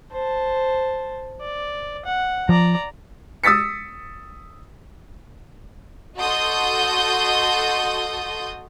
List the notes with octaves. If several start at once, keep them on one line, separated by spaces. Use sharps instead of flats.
C5 A5
D5
F#5
F3 D5 A#5
D#6 E6 A6 B6 C#7
F#4 A4 D#5 C6 D#6 G6